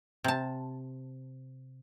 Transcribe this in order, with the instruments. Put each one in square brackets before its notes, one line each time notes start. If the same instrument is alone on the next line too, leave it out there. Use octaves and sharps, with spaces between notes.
[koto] C3 A5